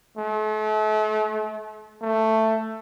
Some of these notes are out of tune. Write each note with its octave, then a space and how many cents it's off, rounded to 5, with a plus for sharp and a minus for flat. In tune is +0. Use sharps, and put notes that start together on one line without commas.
A3 -40
A3 +10